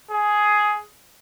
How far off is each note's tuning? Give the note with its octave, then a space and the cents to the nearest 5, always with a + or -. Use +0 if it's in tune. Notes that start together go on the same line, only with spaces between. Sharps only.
G#4 +10